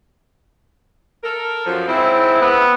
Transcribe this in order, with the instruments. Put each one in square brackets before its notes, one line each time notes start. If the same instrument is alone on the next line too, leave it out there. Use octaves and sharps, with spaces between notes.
[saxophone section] A4 A#4
F#2 F3
[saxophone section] G#2 C#3 C4 [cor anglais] E4
[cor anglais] B3